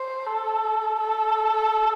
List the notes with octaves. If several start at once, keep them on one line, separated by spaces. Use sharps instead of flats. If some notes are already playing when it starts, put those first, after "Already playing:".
Already playing: C5
A4
A4